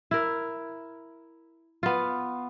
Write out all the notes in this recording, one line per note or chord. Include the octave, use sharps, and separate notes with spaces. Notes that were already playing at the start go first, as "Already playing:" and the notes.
E4 A#4
B3 F4